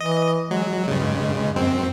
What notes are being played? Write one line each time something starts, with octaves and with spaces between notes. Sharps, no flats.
E3 D#5
F#3 G#3
G2 C#3
F#2 C4